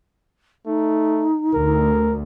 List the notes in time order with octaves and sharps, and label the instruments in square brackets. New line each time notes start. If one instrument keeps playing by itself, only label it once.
[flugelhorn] A3 [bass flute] D#4
[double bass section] D2 [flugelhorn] A#4